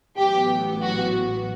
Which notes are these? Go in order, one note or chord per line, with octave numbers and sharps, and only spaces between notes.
A1 A2 F#3 B3 G4
F#4